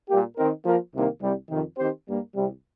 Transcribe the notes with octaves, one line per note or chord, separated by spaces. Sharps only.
A#2 G3 A#3 G4
D#3 C4 D#4 A#4
F3 A#3 F4 A#4
C2 C3 D#3 A#3
C2 C3 G3
F2 C3 D#3
D#3 C4 G4 C5
G2 G3 A#3
C2 C3 G3